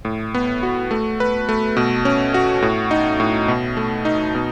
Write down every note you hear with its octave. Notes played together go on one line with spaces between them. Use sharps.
A2
B3
F#4
A3
B4
A3
B2
C#4
F#4
A2
D#4
A2
B2
A3
D#4
B2